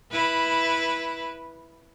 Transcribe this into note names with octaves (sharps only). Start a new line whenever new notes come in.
E4 B4